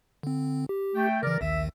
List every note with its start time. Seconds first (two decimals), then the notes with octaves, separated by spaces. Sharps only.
0.23 D3 C4
0.69 G4
0.95 A3 G5
1.23 C#3 E3 A#4 D5
1.41 A#1 D#2 D#3 E5